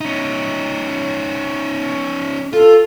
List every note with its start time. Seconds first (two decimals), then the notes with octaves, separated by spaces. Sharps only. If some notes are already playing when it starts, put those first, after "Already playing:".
0.01 C#4 D#4
2.53 F4 A4